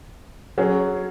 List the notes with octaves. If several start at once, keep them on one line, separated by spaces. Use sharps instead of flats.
F#3 C#4 G#4